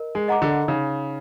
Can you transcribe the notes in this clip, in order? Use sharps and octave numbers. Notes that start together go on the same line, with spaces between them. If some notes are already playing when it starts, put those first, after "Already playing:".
Already playing: A#4 D#5
G#3
D#5 F#5 A#5 D6
D3
C#3 D#4